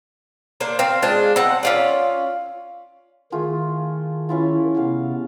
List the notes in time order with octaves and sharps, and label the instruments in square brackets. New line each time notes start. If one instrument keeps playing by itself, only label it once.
[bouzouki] A#3 D4 C5
C4 F5
G#3 D4 F4 C5
C4 F#5
C#4 F4 D5
[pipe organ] D#3 [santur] A3 F4 G#4
[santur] C#4 E4 F4
[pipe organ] C3 B3 [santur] F5